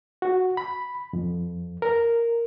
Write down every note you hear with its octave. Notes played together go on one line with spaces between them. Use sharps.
F#4
B5
F2
A#4